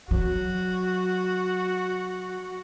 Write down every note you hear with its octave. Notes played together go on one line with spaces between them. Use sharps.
F#3 F#4